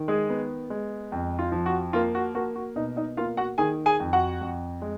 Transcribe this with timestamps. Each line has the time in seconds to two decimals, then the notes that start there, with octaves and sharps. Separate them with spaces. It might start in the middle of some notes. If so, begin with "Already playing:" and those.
Already playing: D#3
0.08 G#3 G#4
0.29 B3
0.70 G#3
1.12 F2
1.39 F4
1.52 F3
1.66 F#4
1.93 A#3 F4
2.15 F#4
2.35 A#3 F#4
2.56 F#4
2.76 B2 D#4 D#5
2.96 D#4 D#5
3.17 A#3 F4 F5
3.37 F#4 F#5
3.58 D#3 G#4 G#5
3.86 G#4 G#5
4.00 F2
4.13 F#4 F#5
4.41 F2
4.82 G#3